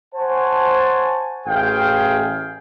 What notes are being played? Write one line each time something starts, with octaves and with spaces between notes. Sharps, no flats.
C5 C#5 F#5 G#5 A5
A1 G#4 F5 G5